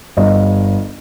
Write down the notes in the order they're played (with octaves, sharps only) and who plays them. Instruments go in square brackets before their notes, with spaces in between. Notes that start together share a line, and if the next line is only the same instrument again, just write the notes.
[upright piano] G1 D#5